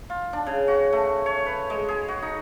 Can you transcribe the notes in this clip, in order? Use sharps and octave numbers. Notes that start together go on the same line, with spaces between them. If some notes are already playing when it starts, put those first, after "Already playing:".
F4
D4
C#3
F#4
A3
C#5
B4
G#3
G#4
F#4
D#4